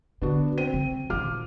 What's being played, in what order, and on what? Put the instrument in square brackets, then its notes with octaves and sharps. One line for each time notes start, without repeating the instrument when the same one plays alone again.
[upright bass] D3 [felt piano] B3 D4 F#4
[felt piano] C4 D#7
[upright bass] C#3
[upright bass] A#2 D#3 [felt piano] F4 D6 F6